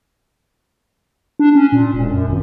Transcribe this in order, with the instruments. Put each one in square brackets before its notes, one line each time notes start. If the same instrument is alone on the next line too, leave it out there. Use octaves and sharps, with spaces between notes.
[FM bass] D4
C#4
A#2
E1
F#2
G#1